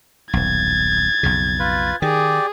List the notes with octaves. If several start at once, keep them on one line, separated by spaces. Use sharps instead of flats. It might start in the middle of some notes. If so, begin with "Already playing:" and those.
D#1 B1 G#6 A6
B1 F2 C#3
F4 B4
D#3 G4 G#4 D5